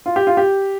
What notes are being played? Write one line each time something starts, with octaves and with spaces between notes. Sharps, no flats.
F4
G4
F4
G4